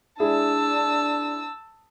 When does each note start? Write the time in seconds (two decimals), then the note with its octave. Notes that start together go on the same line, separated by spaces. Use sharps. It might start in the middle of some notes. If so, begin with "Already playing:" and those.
0.20 G#3 D4 E4 G#4 A5 E6